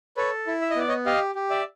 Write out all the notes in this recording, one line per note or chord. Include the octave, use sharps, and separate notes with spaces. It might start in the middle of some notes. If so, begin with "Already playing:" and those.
A4 B4 C#5
E4
E5
D#5
B3 D5
C#5 D#5
G4 D#5 F5
G4
D5 E5